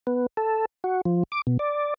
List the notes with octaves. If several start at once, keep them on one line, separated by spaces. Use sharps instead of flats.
B3
A4
F#4
F3
D6
B2
D5